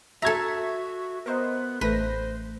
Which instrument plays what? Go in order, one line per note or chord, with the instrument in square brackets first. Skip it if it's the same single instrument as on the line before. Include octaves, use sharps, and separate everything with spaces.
[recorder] F#4 [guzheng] A4 A#5 [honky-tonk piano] E5 G#6
[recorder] B3 [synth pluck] A#4 C5 D#5
[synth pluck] A1 A3 A#6 [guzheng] B4 [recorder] C5